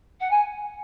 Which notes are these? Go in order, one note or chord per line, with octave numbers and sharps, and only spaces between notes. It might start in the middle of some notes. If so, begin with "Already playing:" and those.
F#5
G#5